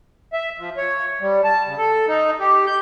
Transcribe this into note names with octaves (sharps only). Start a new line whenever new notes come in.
E5
F3
C#5
G3
A5
C#3
A4
D#4
G4
G6